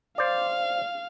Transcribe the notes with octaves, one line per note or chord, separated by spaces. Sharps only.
C5 D5 F5